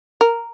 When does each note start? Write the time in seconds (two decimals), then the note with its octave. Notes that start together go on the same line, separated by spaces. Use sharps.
0.21 A#4